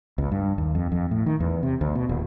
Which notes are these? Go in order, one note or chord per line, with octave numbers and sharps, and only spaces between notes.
C#2
G2
D#2
F2
F2
A2
D#3
E2
C3
D2
B2
D#1